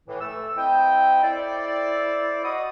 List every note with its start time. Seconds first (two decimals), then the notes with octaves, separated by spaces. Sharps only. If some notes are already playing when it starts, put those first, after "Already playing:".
0.07 A2 E3
0.20 A3 A4 E6
0.56 C4 E4 D#5 G5
1.22 E4 A4 C5 D5
2.43 F#4 D#5 B5 C#6 D#6